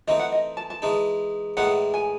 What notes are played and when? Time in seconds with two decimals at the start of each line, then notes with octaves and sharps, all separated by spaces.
0.07 E3 A3 C4 D#4 D#5
0.19 F#5
0.32 D#5
0.57 A5
0.70 A5
0.82 E3 G#3 D#4
1.57 A2 E3 G#3 D#4 F#5
1.94 G#5